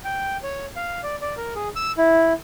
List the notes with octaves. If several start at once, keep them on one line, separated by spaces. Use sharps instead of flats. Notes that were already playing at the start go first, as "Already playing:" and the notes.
G5
C#5
F5
D5
D5
A#4
G#4
E6
E4